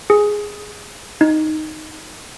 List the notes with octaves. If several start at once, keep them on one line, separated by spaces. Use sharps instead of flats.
G#4
D#4